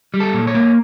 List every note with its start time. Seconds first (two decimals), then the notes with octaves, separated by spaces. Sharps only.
0.14 G3
0.20 A4
0.34 A#2
0.47 C#5
0.55 A#3